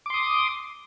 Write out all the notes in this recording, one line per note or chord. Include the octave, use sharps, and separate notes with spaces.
C6 D6 D#6